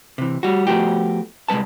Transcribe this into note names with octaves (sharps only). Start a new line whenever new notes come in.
C3 E3
G3 F#4
F3 A3 B3 F#4 G4
C2 G#3 A#3 B4 A5